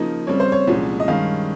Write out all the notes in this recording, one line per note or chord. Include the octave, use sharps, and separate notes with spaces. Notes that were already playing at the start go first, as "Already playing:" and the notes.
Already playing: C#3 F3 A#3 D#4
C#3 G3 C4 C#5
C5
C#5
C2 A#2 F3 G#3 C#4
D#5
G2 D#3 G#3 C#4 F5